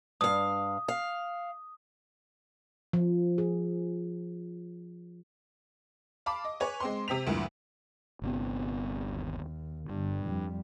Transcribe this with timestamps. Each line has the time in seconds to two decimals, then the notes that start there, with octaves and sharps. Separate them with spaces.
0.21 G2 F5 D#6
0.88 F5
2.93 F3
3.38 G#4
6.26 F5 A5 B5 D6
6.44 D#5
6.60 B4 C#5 G#5
6.80 G#3 C4 C6
7.08 C3 C4 B6 F7
7.26 D2 G2 A#2 E3
8.22 G1 C3 B3
9.08 D#2
9.89 G1 G2
10.25 F2 G3